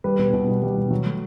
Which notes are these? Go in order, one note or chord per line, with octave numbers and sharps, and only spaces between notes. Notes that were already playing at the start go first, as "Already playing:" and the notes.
G3 B4
B2
B2
G3
G3
B2
F#3
A3